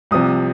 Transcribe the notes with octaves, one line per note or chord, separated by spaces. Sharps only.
C2 C3 F3 D#6